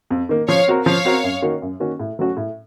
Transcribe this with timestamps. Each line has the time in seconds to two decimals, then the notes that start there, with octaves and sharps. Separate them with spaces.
0.11 F2
0.29 D#3 A#3
0.48 F3 C#5 F5
0.67 C4 F#4 A#4
0.85 F3 C#5 F5
1.05 C4 F#4 A#4
1.24 F#2
1.42 D#3 A#3 C#4 F#4
1.62 F#2
1.80 D#3 A#3 C#4 F#4
2.00 A2
2.19 F#3 A3 C#4 F#4
2.37 A2